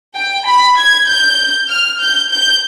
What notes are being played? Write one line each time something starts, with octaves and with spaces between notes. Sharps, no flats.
G5
B5
G#6
G6
F6
G6
G6